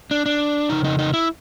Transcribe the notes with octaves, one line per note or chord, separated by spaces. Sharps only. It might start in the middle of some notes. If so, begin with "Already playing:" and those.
D4
D4
F2 C#3 D#4
D#4
D#4
E4